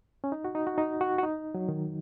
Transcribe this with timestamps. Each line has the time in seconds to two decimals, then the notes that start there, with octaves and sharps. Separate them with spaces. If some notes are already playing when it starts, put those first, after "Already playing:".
0.24 C#4
0.32 D#4
0.45 F#4
0.55 D#4
0.67 F#4
0.78 D#4
1.01 F#4
1.18 F#4
1.23 D#4
1.54 F#3
1.69 D#3